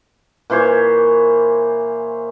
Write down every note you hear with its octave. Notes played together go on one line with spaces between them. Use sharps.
A#2 E3 C5 C#5